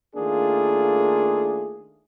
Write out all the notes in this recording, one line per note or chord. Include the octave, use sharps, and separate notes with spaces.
D#3 A3 A#3 D4 F4 G#4